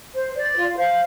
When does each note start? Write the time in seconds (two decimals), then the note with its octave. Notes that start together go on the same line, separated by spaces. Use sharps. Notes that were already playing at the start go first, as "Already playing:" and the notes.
0.13 C5
0.35 C5 D5
0.55 F4
0.77 C5 F5